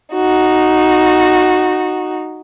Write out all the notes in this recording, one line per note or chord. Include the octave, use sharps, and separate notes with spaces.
D#4 F#4